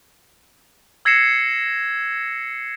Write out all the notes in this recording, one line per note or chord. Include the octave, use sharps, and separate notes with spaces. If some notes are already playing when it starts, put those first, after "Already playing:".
E6 G#6 A#6 C7 C#7 E7